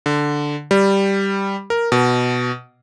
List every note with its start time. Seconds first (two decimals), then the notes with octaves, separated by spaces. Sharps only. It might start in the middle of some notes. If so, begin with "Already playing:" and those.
0.06 D3
0.71 G3
1.70 A#4
1.92 B2